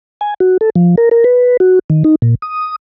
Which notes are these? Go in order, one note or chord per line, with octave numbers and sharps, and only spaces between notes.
G#5
F#4
A4
F3
A#4
A#4
B4
F#4
D#3
D#4
A#2
D#6